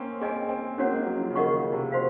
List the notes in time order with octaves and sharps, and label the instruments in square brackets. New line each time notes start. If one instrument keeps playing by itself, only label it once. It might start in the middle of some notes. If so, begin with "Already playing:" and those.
Already playing: [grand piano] A#3 C4 C#4
[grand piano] C4 [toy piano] G#4 D#5 G#5
[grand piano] C4
[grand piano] A#3 [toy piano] C#4 F#4 C#5 F#5
[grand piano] G#3
F#3
F3
C#3
[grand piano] D#3 [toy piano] A#4 D#5 F#5 C#6
[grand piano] C#3
C3
[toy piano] F#4 C5 F5